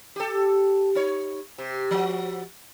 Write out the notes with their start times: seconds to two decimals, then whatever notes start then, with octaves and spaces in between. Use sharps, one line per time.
0.16 G4 A4
0.95 D#4 C#5
1.58 C3
1.91 F3 F#4